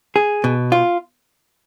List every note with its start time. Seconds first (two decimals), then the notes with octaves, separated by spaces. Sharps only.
0.16 G#4
0.44 B2
0.72 F4